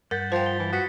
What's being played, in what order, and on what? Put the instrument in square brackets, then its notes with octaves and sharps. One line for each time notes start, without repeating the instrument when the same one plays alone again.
[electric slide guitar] G2 F#5 [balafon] A#4 [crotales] G6 A6 B6
[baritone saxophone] F3 [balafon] C5 G5
[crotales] G7
[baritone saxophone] E3
[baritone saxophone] F#4 [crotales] D#6 B6 C#7